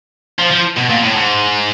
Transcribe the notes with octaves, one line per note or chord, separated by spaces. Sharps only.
F3
F3
B2
A#2
A2
G#2